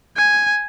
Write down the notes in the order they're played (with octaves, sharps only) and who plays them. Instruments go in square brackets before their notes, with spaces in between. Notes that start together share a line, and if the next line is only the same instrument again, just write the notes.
[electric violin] G#5